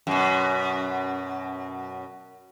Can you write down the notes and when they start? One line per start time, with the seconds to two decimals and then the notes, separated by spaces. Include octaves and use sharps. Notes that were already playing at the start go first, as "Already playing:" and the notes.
0.07 F#2 B2